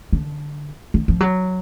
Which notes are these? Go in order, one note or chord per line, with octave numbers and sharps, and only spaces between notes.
D3
D#3
F3
F#3